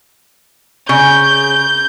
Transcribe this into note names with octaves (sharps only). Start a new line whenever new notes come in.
C#3 G6